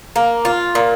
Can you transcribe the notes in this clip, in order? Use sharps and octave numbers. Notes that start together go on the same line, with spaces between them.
A#3
F4
A#2